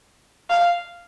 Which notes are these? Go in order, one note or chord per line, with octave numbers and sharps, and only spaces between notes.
F5